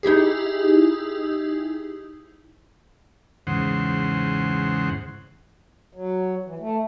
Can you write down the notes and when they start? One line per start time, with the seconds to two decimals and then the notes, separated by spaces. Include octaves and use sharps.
0.03 D#4 E4 G4 G#4
3.47 E2 G#2 C#3 C5 F#5
5.93 F#3
6.45 E3
6.60 A3